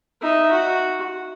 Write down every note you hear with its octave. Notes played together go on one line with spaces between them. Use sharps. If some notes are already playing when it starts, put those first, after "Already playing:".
D#4 E5
F#4